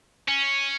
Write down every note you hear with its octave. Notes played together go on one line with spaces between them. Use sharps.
C#4